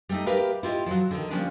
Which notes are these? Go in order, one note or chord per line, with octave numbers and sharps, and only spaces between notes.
G3 A3 D#4
G4 A#4 B4 E5 F5
E4 F4 G4 D#5
F3 F#3
D3 D#3
F3 G3 A#3 C#4 D4